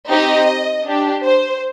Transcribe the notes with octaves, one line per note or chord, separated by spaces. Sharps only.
C4 D#4 G4 D#5
D4
G4
C5